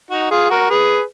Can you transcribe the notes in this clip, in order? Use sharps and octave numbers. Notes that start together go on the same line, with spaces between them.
D#4 F#4
F4 G#4
F#4 A#4
G#4 B4